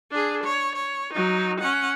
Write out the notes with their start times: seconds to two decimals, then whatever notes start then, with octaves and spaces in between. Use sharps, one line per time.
0.11 D4 G#4
0.43 C#5
0.75 C#5
1.13 F#3 D#4
1.60 C#4 F#5